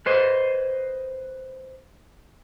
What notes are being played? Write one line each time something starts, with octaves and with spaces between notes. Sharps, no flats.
B4 C5 D#5